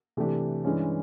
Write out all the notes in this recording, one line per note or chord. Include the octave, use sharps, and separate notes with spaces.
C3 E3 A3 D4 G4
G2 E3 G#3 C#4